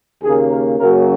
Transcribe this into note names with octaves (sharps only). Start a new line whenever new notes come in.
D#2 C#3 A#3 G#4
A#4
F#2 C#3 F#3 A#3 A#4